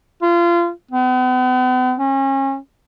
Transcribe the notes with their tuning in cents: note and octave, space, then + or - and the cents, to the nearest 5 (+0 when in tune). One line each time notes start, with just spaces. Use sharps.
F4 -25
B3 +45
C#4 -35